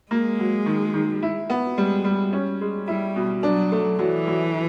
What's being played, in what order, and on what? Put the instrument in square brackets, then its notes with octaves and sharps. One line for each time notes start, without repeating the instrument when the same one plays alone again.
[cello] G#3 [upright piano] A#3
[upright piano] F#3
D#3
D#3
E4
B3
[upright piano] G3 [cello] G#3
[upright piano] G3
C#4
G#3
[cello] G3 [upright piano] E4
[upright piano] B2
[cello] F#3 [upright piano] D4
[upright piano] A3
[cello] E3 [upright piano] F#3
[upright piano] F#3